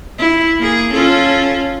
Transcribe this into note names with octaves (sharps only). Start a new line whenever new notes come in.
E4
A#3 G#4
C#4 F4 A4